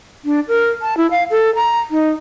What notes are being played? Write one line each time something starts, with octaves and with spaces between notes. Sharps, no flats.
D4
A#4
A5
E4
F5
A4
A#5
D#4